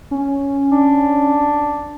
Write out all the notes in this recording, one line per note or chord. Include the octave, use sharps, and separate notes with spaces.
C#4
D4